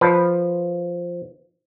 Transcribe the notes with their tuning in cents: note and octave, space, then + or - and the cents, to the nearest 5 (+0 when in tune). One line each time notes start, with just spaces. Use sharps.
F3 +0 B4 +0 A5 +10